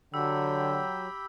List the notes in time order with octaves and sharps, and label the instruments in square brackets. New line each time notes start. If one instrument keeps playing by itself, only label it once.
[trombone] D3 [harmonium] F#3 [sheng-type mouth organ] G4 G5 B5 [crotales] E6